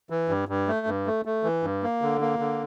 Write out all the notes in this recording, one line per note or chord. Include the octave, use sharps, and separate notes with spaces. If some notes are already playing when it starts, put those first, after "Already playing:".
E3
G2
G2
A3
G2
A3
A3
E3
G2
A#3
D3
A#3
D3